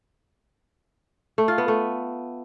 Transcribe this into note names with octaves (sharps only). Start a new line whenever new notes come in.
A3
F4
B3
A3